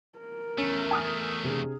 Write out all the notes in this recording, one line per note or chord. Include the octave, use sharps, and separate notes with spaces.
A#4
E2 A3 C#4
G#5 D#6 F6
C3 D4 G#4